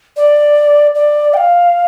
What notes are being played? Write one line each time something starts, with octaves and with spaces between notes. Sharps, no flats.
D5
D5
G5
F5